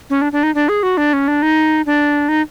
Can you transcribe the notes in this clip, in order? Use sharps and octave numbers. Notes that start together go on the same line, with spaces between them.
C#4
D4
D4
D#4
D4
G#4
F#4
D4
C#4
D4
D#4
D4
D#4